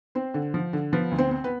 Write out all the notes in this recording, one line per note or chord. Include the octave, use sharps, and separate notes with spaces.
C4 C5
D3
F3
D3
F3 B3 B4
D2
C4 C5
C4
B3 B4